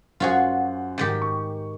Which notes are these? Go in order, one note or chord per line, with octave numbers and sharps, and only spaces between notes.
F#2 F4 F#4 G#4 C5 F#5
G#2 D#3 G4
C#6